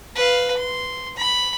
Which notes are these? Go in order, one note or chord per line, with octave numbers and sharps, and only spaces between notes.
B4 F5
C6
B5